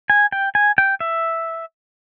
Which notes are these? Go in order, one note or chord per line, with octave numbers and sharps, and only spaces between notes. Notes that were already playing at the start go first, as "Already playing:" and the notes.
G#5
G5
G#5
G5
E5